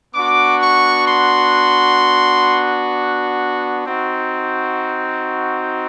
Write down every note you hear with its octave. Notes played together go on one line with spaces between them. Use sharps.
B3 D4 F#4 D6
C#6
C6
C4 D#4 F#4